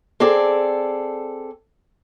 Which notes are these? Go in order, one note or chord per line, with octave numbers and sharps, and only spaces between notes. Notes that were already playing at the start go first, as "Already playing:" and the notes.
C4 G#4 A4 D5